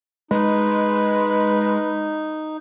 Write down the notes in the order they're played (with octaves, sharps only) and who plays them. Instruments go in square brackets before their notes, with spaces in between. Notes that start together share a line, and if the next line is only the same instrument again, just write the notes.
[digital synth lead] G#3 [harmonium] D#4 [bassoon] B4